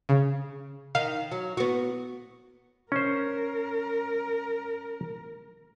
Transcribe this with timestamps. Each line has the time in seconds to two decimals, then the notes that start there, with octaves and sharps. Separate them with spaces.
0.09 C#3
0.95 D#3 F5
1.31 F#3
1.57 B3 F#4
2.92 C#4 A#4 C5